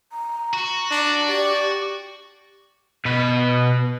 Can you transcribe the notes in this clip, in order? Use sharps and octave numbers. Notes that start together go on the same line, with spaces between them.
A#5
F#4
D4
G4 D5
B2 B4